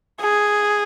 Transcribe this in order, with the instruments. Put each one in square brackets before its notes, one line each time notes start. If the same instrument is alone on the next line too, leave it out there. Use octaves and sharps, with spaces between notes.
[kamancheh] G#4